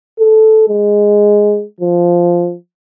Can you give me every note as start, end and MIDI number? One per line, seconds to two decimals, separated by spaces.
0.19 0.65 69
0.68 1.63 56
1.80 2.54 53